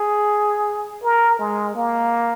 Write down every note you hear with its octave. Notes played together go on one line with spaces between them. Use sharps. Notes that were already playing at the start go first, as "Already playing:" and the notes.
Already playing: G#4
A#4
G#3
A#3